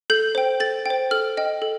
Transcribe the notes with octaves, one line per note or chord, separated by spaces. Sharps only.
A4 G6
C5 G5
A4 A6
C5 G5
A4 F6
D#5 G5
A4